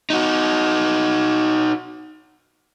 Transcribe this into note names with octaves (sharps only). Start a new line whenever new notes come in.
D#4 F#4